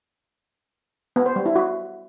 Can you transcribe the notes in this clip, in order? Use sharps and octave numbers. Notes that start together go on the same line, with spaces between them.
B3
C5
G3
E4
F#4